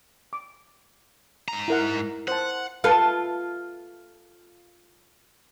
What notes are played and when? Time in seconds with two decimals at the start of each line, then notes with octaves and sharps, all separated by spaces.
0.33 D6
1.48 G#2 A#5
1.68 E4 A#4 F#5
2.28 C5 F#5 A5
2.84 F4 A4 B4